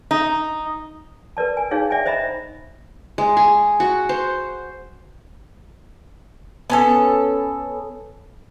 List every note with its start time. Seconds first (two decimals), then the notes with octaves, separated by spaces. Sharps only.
0.11 D#4
1.37 A#4 B4 D5 A5
1.57 G#5
1.71 D4 D#4 G#4 C#5 F5
1.91 D5 E5 G5 G#5
2.06 C5 D#5 E5 A#5 B5
3.18 G#3
3.37 G#4
3.80 F#4
4.09 C5
6.70 B3 C#4 A4